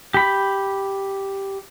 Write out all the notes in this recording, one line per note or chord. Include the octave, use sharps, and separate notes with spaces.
G4 B5